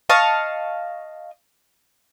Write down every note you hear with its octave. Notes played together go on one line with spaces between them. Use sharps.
D#5 F5 A5 C#6